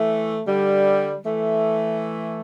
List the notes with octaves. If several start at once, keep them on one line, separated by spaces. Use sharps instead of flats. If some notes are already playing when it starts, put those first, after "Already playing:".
Already playing: E3 A3
D3 G3
E3 A3